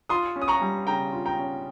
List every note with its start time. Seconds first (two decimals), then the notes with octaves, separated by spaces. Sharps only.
0.09 F4 C6 D#6
0.36 C#4
0.42 D#6
0.48 A#5 C#6
0.61 G3
0.87 C#3 G5 A#5
1.13 F4
1.25 G5 A#5
1.39 C#4